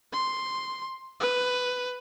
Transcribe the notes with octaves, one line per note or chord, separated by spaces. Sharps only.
C6
B4